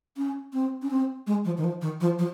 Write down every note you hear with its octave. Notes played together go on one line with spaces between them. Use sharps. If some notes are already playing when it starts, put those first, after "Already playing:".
C#4
C4
C#4
C4
G#3
F3
D#3
F3
D#3
F3
F3